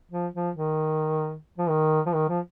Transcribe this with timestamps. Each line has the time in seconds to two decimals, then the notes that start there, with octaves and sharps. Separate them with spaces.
0.11 F3
0.34 F3
0.56 D#3
1.58 F3
1.69 D#3
2.06 F3
2.14 D#3
2.29 F3